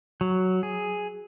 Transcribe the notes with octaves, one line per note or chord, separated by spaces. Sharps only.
F#3
G#4